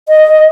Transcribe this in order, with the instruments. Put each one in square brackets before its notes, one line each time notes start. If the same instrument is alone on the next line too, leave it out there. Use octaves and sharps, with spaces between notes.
[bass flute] D#5